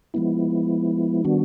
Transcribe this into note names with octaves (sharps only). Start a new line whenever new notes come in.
F3 G#3 B3 E4
D#3 G3 B3 D4 F#4